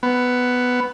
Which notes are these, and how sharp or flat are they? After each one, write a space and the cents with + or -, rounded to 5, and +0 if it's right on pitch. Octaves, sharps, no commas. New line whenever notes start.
B3 +5